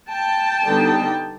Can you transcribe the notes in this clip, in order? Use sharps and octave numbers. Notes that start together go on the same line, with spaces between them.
G5 A5
D3 G3 B3 D#4